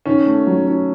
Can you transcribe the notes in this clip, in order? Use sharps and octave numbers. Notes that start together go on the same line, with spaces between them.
D#3 C#4
A3
F#3
C#4